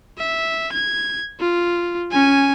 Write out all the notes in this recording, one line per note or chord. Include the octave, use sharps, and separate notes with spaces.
E5
G#6
F4
C#4 G#5